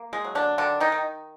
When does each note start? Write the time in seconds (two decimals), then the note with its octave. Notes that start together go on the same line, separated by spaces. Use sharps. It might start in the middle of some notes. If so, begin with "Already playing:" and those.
Already playing: A#3
0.13 G#3 G#4
0.24 F#3
0.35 D3 D4
0.58 D3 D#3 D4
0.80 D#3 D#4
0.92 D#3